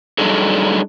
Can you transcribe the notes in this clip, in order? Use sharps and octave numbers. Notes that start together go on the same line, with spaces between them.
F#3 G3 D4 D#4 G#4 A4